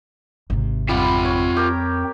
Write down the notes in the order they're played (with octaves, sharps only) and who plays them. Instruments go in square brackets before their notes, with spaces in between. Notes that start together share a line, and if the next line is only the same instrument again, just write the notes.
[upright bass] G#1 C3
[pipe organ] F2 C4 [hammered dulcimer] G3 [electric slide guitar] F4 E5 F#5
[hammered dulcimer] C#5
G4 A#4 A#5